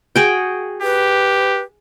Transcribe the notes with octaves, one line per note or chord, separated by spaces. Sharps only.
F#4 G#4 G5
G4 B4